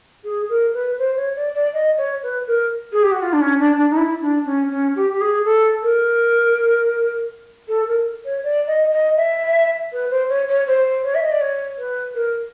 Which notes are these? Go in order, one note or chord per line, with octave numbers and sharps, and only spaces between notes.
G#4
A#4
B4
C5
C#5
D5
D5
D#5
C#5
B4
A#4
G#4
G4
F#4
F4
D4
C#4
D4
D4
D#4
E4
D4
C#4
C#4
G4
G4
G#4
A4
A#4
A4
A#4
C#5
D5
D#5
D#5
E5
B4
C5
C#5
C#5
C5
C#5
E5
D#5
D5
C#5
B4
A#4